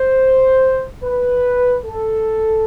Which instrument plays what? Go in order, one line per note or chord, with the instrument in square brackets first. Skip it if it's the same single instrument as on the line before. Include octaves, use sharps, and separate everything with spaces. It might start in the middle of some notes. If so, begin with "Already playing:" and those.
Already playing: [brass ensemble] C5
B4
A4